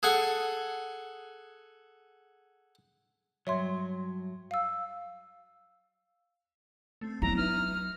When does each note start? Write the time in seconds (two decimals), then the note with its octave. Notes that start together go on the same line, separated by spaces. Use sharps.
0.03 G#4 A4 F#5 G#5
3.47 G2 F#3 C#5 E5 C6
4.51 F5 E6
7.01 A3 C4
7.22 F#3 B3 C4 D4 E4 A#5
7.37 D#4 B4 E5 F6